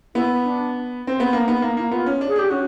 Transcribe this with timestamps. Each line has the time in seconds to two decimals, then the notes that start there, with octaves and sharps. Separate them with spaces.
0.15 B3 E4
0.44 D4
1.07 C4
1.20 B3
1.32 A#3 D4
1.48 B3 D#4
1.62 A#3 D#4
1.77 A#3 E4
1.91 B3 F4
2.06 C#4
2.21 D4
2.28 G#4
2.36 D4 G4
2.50 C#4 F#4